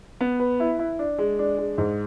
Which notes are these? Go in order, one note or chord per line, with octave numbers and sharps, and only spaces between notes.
B3
B4
E4
E4
D4
G#3
D4
G#3
G#2